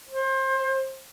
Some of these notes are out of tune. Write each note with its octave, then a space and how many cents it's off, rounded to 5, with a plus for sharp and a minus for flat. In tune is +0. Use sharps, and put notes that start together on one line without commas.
C5 +25